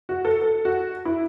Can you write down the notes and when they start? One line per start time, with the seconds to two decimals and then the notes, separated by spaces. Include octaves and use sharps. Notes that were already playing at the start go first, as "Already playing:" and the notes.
0.09 F#4
0.25 A4
0.41 A4
0.65 F#4
1.05 E4